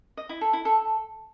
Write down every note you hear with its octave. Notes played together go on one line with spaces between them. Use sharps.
D#5
E4
A4
E4
A4